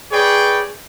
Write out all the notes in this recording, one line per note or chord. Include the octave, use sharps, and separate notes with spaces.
G#4 B4 C#5 D5 G5